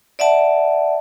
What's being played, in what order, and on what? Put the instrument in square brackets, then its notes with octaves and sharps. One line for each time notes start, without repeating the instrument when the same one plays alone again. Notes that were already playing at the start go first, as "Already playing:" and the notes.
[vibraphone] D5 E5 F#5 A5